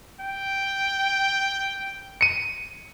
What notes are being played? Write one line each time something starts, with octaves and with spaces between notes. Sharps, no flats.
G5
C#7 D#7